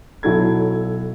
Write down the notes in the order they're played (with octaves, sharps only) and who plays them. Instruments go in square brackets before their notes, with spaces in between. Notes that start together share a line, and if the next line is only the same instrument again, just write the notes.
[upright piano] B1 F#3 E4 A4 G#6